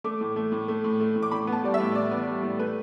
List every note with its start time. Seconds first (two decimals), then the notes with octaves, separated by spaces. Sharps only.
0.04 A3 D6
0.21 A2
0.36 A3
0.52 A2
0.68 A3
0.84 A2
1.00 A3
1.16 A2
1.23 D6
1.32 A2 B5
1.47 B3
1.52 A5
1.64 G3 D5
1.74 E5
1.80 A2
1.95 A2 D5
2.11 B3
2.27 G3
2.43 A2
2.59 A3 B4